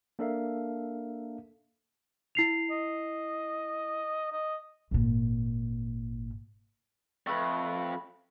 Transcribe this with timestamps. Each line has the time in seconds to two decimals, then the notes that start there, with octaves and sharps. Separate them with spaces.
0.19 A#3 D4 A4 A#4 E5 F5
2.35 E4 C7 F7
2.70 D#5
4.32 D#5
4.91 G#1 A#2
7.27 F2 A3 B4